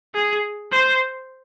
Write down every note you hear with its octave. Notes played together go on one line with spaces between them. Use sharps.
G#4
C5